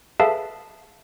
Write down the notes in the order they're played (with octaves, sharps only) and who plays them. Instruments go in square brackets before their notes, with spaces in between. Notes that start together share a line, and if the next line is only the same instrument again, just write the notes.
[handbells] G#4 A4 B4 E5 F5 A5